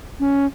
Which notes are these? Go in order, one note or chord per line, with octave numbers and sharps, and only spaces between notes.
C#4